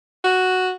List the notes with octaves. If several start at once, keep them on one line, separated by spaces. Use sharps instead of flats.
F#4